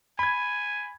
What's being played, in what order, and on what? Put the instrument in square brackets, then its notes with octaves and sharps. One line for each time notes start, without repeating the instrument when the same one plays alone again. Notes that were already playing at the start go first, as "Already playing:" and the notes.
[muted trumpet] G#5 [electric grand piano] B5 G#6